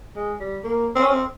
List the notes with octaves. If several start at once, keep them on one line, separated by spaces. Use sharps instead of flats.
G#3
G3
A#3
C4
C#4
C4